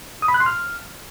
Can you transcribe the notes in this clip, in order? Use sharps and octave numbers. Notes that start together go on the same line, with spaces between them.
D#6
B5
F#6
C6
F6